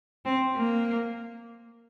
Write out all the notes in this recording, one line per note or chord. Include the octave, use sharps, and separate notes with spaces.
C4
A#3